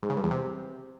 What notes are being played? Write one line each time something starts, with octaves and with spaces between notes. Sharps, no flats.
G#2
C#3
G2
E2
C3